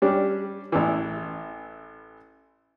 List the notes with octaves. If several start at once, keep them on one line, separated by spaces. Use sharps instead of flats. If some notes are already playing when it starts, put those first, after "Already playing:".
G3 C#4 D4 G4
A1 E3